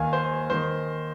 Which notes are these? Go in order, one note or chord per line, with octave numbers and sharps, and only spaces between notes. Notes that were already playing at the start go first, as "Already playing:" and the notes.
Already playing: D#2 D#3 F5 G#5
C5
D#3 C5